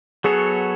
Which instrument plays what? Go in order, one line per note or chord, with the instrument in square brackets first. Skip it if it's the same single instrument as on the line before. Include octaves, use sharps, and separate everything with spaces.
[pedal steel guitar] F#3 B3 F#4 A4 C#5 [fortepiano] G#4